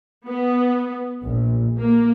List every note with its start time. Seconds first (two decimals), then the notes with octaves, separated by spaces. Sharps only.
0.27 B3
1.23 A#1
1.79 A#3